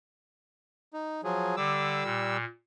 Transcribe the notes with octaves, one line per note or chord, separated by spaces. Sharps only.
D#4
F3 F#3 G#4
D3 G3 D6 E6
A#2